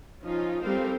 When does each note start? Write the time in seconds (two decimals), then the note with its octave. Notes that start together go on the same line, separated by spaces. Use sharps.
0.23 F3 C#4 D#4 F4
0.61 G3 C4 A4 A#4 C5 F5